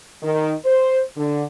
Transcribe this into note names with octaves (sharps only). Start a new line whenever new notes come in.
D#3
C5
D3